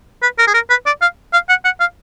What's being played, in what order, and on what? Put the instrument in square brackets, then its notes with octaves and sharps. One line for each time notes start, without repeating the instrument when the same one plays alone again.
[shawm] B4
A#4
G#4
A#4
B4
D5
F5
F5
F#5
F#5
F5